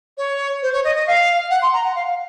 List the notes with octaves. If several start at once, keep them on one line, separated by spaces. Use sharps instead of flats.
C#5
C5
C#5
D#5
D#5
F5
F#5
C6
A#5
F#5
F5
F5